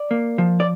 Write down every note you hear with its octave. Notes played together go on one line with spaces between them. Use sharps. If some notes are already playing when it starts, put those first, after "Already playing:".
Already playing: D5
A#3
F3
D5